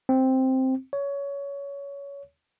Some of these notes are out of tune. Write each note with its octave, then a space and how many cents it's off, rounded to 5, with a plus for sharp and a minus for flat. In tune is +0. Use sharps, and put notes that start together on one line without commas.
C4 +0
C#5 +20